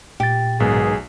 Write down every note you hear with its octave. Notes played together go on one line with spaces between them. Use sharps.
A#2 G4 A6
B1 G#2 D#3 B3 G#4